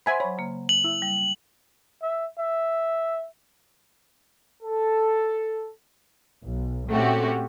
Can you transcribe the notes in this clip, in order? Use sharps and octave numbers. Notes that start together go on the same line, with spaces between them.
C5 E5 F#5 G#5 B5 C6
F#3 C#5 B5
C#3 A#3
F#7
E4 E6
G3
E5
E5
A4
B1
A#2 A3 C4 C#4 F#4 G4